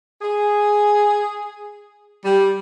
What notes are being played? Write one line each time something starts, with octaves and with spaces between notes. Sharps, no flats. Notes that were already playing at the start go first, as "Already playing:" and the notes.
G#4
G3